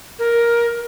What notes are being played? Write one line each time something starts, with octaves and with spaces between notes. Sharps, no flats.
A#4